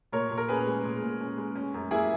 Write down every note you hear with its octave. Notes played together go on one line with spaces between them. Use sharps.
A#2 A#4 C#5
A#2
A#4
C#4 G#4 B4
G#3
A#2
A#2
C#4
G#3
C#4
F#2
A#3 E4 G#4